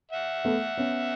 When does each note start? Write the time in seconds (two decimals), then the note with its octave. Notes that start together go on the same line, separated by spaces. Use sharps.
0.12 E5 F#5
0.45 A3 B3
0.77 B3 C#4